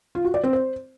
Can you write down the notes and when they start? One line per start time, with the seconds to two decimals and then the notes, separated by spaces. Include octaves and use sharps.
0.15 F4
0.24 F#4
0.34 D5
0.43 C4
0.53 C5